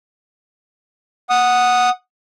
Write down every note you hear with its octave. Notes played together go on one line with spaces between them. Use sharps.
F#5 D#6